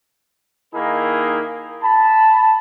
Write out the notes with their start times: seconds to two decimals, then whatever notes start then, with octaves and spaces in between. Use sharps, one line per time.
0.74 D#3 A#3 D#4 E4 G#4 A#4
1.83 A5 B5